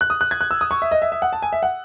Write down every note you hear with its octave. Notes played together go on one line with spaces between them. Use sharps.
F#6
D#6
F#6
G#6
F#6
E6
D#6
C#6
E5
D#5
E5
E5
F#5
A5
G#5
E5
F#5